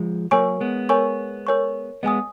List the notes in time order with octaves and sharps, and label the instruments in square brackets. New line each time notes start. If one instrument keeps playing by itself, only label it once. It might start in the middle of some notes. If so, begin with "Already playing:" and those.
Already playing: [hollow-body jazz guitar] F3 G#3
[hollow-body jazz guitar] F#3 A#3 [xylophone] A#4 C#5 G#5 C#6
[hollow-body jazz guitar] G#3 B3
[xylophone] A#4 C#5 G#5 C#6
A#4 C#5 G#5 C#6
[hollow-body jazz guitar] G#3 B3 [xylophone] D#5 G#5 D#6